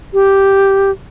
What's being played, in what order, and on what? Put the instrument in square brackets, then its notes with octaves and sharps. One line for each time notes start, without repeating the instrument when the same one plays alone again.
[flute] G4